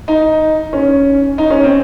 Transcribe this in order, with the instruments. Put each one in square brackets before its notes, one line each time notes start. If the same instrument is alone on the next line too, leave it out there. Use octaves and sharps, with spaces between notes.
[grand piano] D#4
C#4
D#4
C#4
C4